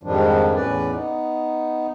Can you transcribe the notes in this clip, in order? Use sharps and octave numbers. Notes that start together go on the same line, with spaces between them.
F2 G#2 D#3 F3 G3 D4
E2 A2 C#4 B4 D5
B3 D#4